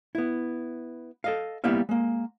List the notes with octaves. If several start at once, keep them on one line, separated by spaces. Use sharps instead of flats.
B3 E4
A4 D#5 F5
G3 A#3 B3 E4 E5 F5
G#3 A#3